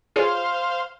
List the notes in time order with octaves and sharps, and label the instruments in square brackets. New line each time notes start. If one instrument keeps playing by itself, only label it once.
[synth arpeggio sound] F4 G#4 C#5 [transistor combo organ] C5 F5